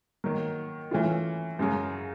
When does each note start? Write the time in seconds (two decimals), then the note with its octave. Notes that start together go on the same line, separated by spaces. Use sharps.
0.24 D#3 F#3 A#3
0.91 E3 A3 C#4 F4
1.59 F#2 C#3 F#3